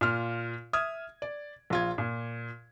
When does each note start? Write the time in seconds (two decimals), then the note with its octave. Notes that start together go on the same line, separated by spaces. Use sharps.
0.01 A#2 F4 F6
0.73 E5 D#6 F6 G#6
1.22 D5
1.70 A#1 F4 G#6
1.98 A#2